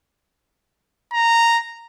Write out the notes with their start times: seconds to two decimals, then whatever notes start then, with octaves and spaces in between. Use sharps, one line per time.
1.13 A#5